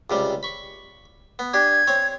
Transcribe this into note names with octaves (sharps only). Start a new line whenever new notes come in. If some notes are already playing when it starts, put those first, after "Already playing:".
C#2 C3 G3
B5 C#6
B3
D4 G4 G#6
C4 C#5